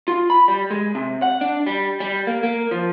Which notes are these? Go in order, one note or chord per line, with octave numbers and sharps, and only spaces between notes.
F4
B5
G3
G#3
C3
F#5
D4
G3
G3
A#3
A#3
F3